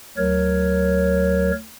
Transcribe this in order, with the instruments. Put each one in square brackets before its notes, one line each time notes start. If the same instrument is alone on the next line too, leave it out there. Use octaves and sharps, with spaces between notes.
[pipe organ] D2 F#3 A#4 C#5